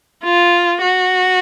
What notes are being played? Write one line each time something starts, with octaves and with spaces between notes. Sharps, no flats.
F4
F#4